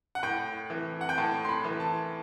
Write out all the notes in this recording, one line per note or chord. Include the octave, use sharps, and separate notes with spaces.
F#5
A2 G5
E3
F#5
G5
A2 A5
C6
B5
E3
A5